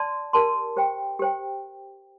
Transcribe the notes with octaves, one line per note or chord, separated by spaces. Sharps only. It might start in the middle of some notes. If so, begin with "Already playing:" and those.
Already playing: D5 A5 C6
G4 A#4 D5 A5 C6
G4 C5 G5
G4 C5 G5